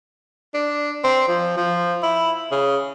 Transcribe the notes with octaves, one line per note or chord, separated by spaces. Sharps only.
D4
C4
F3
F3
E4
C#3